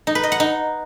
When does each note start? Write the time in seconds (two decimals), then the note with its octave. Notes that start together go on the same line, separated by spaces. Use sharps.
0.07 D#4
0.15 B4
0.23 D#5
0.32 F#5
0.40 D#4